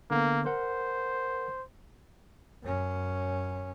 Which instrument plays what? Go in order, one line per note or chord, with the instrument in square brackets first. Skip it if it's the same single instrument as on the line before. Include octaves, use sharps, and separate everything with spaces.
[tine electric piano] D3 B3 [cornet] A#3
[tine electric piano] A#4 F#5 [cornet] C5
[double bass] F#2 C#4